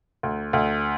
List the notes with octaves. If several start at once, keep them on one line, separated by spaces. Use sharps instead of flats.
D2
D2